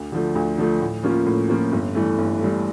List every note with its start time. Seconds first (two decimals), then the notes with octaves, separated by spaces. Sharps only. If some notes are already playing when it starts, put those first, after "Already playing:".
Already playing: D2
0.12 D3 F3 A3
0.35 D2
0.58 D3 F3 A3
0.80 A2
1.03 F3 A#3 C#4 F4
1.26 A2
1.49 F3 A#3 C#4 F4
1.72 G1
1.95 G2 E3 A3
2.18 G1
2.40 G2 E3 A3